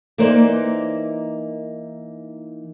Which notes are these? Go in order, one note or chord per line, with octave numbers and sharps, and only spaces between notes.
E3 A#3 D#4 A#4 C5 D5